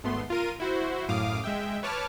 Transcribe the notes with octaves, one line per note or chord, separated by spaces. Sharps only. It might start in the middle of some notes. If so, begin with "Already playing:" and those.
G#1 A3 B3 C6
F4 A#4 D#7
E4 F#4 C5
F#2 A2 F5 D6 D#6
G#3 E5 G5
B4 C#5 A5 D6 F6